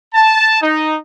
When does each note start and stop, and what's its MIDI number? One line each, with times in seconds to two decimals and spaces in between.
0.14 0.58 81
0.62 0.97 63